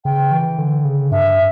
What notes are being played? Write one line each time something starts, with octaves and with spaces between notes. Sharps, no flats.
C#3 G5
E3
D3
C#3
G2 E5